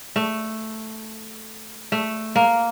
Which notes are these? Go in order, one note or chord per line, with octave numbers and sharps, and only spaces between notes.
A3
A3
A#3